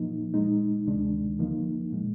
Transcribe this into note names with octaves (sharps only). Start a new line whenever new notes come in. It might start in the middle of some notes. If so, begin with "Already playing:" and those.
Already playing: A#2 F3 A#3 D#4
A#2 G#3 D#4
D2 C3 D#3 G#3 D4
D3 F3 A#3 D#4
A#2 G#3